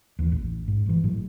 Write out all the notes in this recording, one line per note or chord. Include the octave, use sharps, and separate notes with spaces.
D#2 E3
A1
G#2
G1 E3
A2 F#3